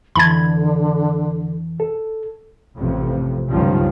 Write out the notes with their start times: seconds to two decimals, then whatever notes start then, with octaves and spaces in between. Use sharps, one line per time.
0.16 F2 D3 E3 A5 B5 G#6
1.80 A4
2.79 A1 F2 C3
3.49 C#2 G2 D#3 F3 F#3